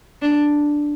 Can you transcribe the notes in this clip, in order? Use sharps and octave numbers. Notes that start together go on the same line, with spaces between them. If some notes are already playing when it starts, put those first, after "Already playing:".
D4